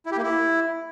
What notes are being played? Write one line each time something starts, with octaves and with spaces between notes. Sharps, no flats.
E4
G4
A#3
E4